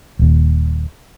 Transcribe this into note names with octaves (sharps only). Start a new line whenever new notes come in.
D#1 D#2